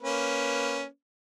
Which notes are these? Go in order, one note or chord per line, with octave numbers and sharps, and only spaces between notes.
A#3 C#4 B4